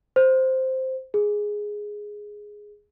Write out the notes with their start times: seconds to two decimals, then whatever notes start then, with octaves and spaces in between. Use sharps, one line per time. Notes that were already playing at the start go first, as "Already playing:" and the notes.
0.16 C5
1.14 G#4